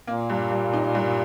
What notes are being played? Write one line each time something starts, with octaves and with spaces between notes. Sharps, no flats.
A#2 A#3
G2
G2
D#4
G2